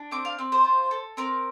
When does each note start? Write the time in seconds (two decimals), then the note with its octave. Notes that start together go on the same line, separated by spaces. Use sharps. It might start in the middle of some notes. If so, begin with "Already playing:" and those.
Already playing: D4
0.11 C4 D6
0.25 F5
0.39 C4
0.52 C5
0.64 F4
0.91 A4
1.17 C4 A#4